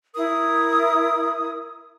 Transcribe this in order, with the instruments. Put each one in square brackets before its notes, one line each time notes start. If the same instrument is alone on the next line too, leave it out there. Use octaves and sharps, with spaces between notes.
[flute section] E4 A#4 D#6